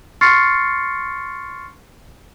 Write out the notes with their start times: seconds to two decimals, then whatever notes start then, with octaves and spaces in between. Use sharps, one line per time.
0.21 C6 C#6 F6 A6 C7 C#7